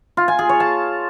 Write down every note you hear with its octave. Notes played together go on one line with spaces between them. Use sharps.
F4
G#5
G#4
C#5
A5